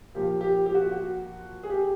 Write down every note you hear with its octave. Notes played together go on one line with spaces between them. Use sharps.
A#2 F3 A#3 G4
G4
G4
F#4
F#4
G#4
G4